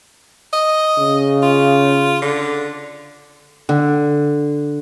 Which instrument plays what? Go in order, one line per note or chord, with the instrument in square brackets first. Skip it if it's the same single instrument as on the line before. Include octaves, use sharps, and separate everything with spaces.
[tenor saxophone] D#5
[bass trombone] C#3
[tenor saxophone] F4
D3
[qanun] D3